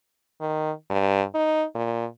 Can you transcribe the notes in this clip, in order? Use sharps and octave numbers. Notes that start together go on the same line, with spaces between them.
D#3
G2
D#4
A#2